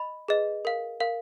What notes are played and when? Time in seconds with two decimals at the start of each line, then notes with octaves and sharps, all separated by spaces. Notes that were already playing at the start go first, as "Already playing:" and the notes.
Already playing: D#5 B5
0.28 G#4 B4 D#5
0.65 A#4 F5
1.00 A#4 F5